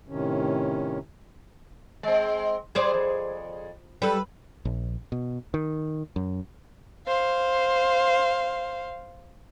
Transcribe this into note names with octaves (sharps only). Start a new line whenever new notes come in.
A2 C3 D#3 C#4
G#3 C4
G3 G#4 C5 D5
F2
G3 A4 B4
A#1
B2
D#3
F#2
C5 F5